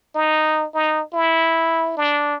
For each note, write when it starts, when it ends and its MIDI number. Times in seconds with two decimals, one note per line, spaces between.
0.15 0.66 63
0.74 1.02 63
1.13 1.92 64
1.97 2.35 62